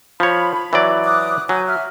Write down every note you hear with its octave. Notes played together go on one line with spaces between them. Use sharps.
F3 C#5 B5
E3 F#3 D5
D6 D#6 F#6
F#3 G#5 G6
E5 F6